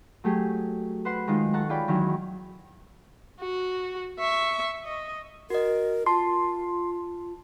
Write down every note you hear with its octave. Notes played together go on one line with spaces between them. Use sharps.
F#3 A3 G4 G#4
B4 C5 F#5 C6
D#3 G#3 D#4 F4
A4 F#5 A5 A#5 C#6
F4 G#4 C#5 D5 G5 B5
E2 D#3 E3 F#3
F#4
E5 C#6
D#5
F#4 A#4 D#5
F4 A5 C6